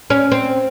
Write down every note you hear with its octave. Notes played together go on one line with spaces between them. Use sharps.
C#4
C4